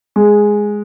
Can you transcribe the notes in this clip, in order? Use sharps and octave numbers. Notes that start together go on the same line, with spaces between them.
G#3